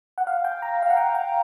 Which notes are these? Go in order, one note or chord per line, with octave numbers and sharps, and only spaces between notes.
F#5
F5
G5
A#5
F5
F#5
G5
G5